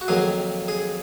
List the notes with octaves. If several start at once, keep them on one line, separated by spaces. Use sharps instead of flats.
F#4
F2 D#3 F#3 A#3 G#4
G#4